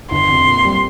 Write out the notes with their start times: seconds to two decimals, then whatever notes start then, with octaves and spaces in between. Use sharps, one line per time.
0.11 G1 C6
0.29 F2 C3
0.47 A#2
0.65 G3 C4